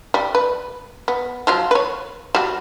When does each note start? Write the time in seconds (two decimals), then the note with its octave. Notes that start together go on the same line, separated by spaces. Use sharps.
0.14 G3
0.35 B4
1.08 B3
1.47 F3 F#3 F4
1.71 B4 C#5
2.35 G3 F#4